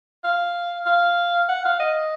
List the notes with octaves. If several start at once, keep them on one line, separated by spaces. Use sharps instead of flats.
F5
F5
F#5
F5
D#5